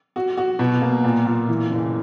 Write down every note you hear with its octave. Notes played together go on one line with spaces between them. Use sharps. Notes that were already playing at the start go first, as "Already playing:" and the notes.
F#4
F#4
B2
A#3
A#2
A#2
E3
F#1